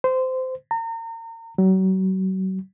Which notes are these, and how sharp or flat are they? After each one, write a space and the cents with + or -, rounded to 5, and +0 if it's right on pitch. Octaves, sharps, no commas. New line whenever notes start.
C5 -20
A#5 -35
F#3 +35